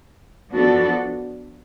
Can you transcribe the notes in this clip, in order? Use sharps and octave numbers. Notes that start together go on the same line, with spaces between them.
F3 B3 D4 F#4 A4